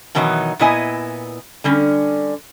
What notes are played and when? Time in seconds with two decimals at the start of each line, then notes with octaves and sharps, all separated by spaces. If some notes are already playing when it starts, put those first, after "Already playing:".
0.15 B2 D#3 E3 F#3 D#4 B4
0.59 A#2 B3 E4 D#5 G#5
1.64 D3 G3 C#4